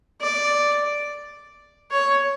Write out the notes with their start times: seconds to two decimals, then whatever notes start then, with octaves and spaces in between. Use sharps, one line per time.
0.21 D5
1.92 C#5